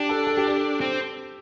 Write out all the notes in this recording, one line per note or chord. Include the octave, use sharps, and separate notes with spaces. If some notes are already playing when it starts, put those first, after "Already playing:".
Already playing: D4 G4
A4
A4
G4
A4
C4